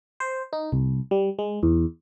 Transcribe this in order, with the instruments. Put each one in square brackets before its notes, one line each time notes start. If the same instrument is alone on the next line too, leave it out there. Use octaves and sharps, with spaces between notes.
[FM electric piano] C5
D#4
C2
G3
G#3
E2